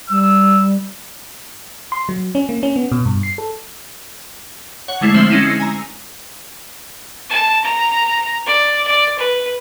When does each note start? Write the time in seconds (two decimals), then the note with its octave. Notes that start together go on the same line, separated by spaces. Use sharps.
0.10 G3 E6
1.92 C6
2.09 F#3
2.35 C#4
2.49 A#3
2.63 C#4
2.76 B3
2.92 B2
3.05 G2
3.23 C7
3.38 A4
4.88 C#5 F#5
5.01 D3 G#3 A3 E4 C#5 C7
5.14 F3 C4 C5 E5 F#7
5.30 G#3 C#4 D#4 E4
5.46 E6 A#6 C7
5.59 G#5 A#5
7.30 A5
7.64 A#5
8.46 D5
8.87 D5
9.19 B4